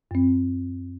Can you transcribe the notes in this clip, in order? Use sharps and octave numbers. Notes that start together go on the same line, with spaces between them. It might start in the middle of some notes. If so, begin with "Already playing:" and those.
F#2 C4